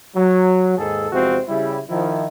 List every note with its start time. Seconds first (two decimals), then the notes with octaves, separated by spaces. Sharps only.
0.14 F#3
0.77 D#2 G#2 G#4 A4
1.12 E2 C3 F3 G#3 C4 F#4
1.48 C#3 G3 E4
1.89 D#3 F3 E4